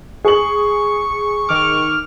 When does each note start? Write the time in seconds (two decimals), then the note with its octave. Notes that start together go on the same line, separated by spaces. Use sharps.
0.25 G#4 C#6 F#7
1.49 D#3 D6 F6